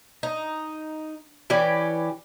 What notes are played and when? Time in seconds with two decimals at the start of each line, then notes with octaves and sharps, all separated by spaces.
0.23 D#4
1.50 E3 C#4 G4 D5